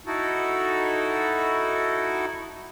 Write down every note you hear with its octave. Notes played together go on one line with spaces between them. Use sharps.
D#4 E4 F#4 A4